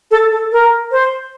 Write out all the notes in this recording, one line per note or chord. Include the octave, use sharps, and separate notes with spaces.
A4
A4
A#4
C5